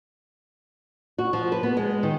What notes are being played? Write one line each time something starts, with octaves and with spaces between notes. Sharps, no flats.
F#4
F3
B4
B3
G#3
D#3